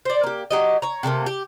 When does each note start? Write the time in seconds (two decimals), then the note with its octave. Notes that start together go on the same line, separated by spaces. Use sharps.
0.05 C5 D5
0.24 A#3 G4
0.51 F#3 G4 D#5
0.82 C#5 A#5
1.03 C3 G3 A3 A#3
1.26 G4